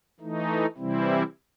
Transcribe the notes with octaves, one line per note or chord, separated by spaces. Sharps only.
E3 A3 D#4
C3 E3 G3 C4 E4